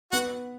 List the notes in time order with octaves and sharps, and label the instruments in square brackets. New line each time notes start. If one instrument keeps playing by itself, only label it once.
[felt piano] B3 B4 [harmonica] F#4 F#5